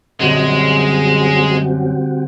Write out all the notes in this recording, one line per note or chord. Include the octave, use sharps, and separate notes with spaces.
F#2 A#2 D3 G3 G#3 C4 F#4 G4